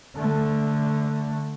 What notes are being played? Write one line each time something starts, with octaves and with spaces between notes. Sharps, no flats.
D3 A3